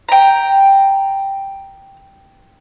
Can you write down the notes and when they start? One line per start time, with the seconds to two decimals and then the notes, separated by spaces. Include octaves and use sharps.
0.08 G5 A#5